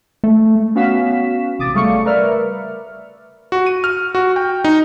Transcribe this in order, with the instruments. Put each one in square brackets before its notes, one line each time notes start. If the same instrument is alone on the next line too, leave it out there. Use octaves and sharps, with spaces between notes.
[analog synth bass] A3
[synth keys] B3 C#4 F#4 F5 B6 E7
A1 C3 D6 D#6 A6
C#3 G3 A3 F5 C#6 C#7
A#4 B4 D5 E5 F6
[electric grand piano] F#4
D#7
F6
F#4
G5
D#4